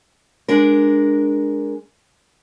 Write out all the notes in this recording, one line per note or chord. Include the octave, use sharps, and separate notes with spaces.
G#3 D4 A#4